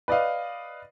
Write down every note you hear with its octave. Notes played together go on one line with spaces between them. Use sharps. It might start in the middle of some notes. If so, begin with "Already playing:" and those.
B4 D5 D#5 F5